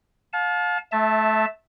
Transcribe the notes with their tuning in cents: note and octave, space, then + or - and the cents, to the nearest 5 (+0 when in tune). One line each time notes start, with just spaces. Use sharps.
F5 +30 A5 -25
A3 -25 E5 +0 A5 +0